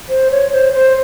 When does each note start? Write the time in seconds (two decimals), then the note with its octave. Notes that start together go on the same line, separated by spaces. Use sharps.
0.09 C5
0.31 C#5
0.52 C5
0.74 C5